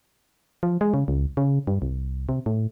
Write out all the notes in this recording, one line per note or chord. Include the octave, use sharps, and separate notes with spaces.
F3
G#3
C#3
C#2
C#3
G2
C2
C3
A2